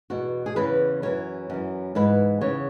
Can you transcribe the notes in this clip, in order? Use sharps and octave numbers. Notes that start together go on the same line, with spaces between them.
E2 B2 F#4
G#4
E2 C#3 E3 B4
F#2 E3 C#5
F#2 E3
G#2 E3 B4
E2 C#3 E3 C#5